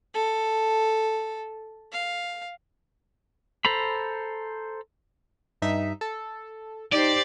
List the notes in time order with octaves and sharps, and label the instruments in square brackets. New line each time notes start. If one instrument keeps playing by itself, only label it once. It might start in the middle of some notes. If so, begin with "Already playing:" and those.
[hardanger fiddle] A4
F5
[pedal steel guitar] A4 C5 A#5 B5
[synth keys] G2 D#4 E5
A4
[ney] D#4 [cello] G4 C5 [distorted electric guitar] D5